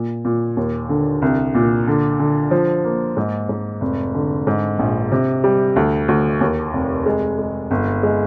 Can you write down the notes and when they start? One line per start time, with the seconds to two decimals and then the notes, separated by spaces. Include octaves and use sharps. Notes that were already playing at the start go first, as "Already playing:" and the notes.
Already playing: A#2
0.25 A#2
0.57 D#2
0.89 D3
1.22 C2
1.55 A#2
1.88 D3
2.20 D3
2.51 F3
2.85 A#3
3.17 G#2
3.49 G#2
3.81 F1
4.14 D3
4.47 G#2
4.79 A#1
5.12 C3
5.44 G3
5.76 D2
6.08 D2
6.41 D#2
6.73 F1
7.06 G#3
7.39 G#3
7.71 G1
8.03 G#3